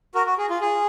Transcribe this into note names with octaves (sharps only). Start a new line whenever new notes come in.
F#4 A#4
F#4
G#4
F4
G#4